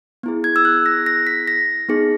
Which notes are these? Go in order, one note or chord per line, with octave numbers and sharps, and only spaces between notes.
B3 E4 G#4
G#6
E6
F#6
A#6
A#6
B6
A#6
B3 D#4 G#4